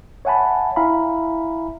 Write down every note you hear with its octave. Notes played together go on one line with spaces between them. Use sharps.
C#5 E5 F#5 G#5 A5 B5
E4 E5 F5 G#5 A#5 B5